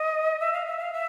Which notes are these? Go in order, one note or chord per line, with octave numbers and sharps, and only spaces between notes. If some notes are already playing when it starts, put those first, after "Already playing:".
Already playing: D#5
E5
F5
E5
F5
E5